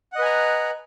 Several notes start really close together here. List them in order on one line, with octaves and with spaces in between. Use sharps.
F#5 D#5 B4 G#5 A#5